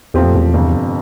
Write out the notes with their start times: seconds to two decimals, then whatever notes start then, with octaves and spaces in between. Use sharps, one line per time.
0.14 E2 A#2 F3 A3 C4 G4
0.25 F2
0.35 E2
0.53 G1 F2 C3